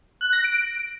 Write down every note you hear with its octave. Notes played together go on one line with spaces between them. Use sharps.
F#6
A#6
D7